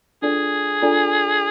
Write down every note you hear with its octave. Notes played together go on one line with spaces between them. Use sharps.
D4 F4 G#4 A4 D5 G#5
D4 F4 A4 D5 G#5